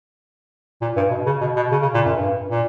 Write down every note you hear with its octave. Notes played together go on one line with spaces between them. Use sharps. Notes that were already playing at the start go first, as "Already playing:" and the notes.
A#2
G2
B2
C#3
B2
B2
C#3
C#3
A#2
F#2
G2
A#2